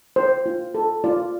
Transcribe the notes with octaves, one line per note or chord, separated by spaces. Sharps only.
C5
F4
A4
F4 D5